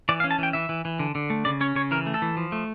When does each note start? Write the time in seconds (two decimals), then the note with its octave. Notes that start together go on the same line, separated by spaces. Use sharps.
0.09 E3 D5
0.20 F5
0.24 C#4
0.31 A5
0.39 E3 G5
0.53 E3 E5
0.69 E3
0.85 E3
0.99 D3
1.15 D3
1.30 A3
1.45 C#3 D5
1.61 C#4 C#5
1.76 C#3 C#5
1.91 E3 A#4
2.06 A3
2.14 A4
2.22 E3
2.37 F3
2.52 A3